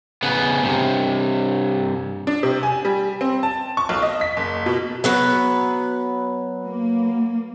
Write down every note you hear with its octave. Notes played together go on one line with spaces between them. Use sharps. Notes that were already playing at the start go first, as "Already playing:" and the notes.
C#3 B3
G2 C3
D4
C3
G#5
G3
C4
A5
C#6
B1
D#5
B6
F#1
B2
F#3 B3 B4
A#3